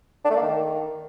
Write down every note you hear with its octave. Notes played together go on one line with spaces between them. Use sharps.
D4
A3
A#3
D#3